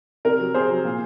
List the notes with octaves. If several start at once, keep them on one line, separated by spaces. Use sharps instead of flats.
C3 A#4
F#3
C3 G#4 C5
F#3
A#2